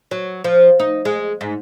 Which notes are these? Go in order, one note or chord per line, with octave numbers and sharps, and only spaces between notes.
F#3
F3
D#4
G#3
G#2